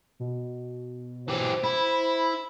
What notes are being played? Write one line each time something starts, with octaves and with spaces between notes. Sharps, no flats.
B2
E3 G4 C5
E4 B5